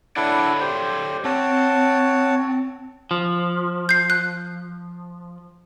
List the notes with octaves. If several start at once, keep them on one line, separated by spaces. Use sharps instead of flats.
D4 E4 A4 C#5 D5 F#5
G4 C5
C4 C#5 F#5 A5
F3
G6 C7
F#6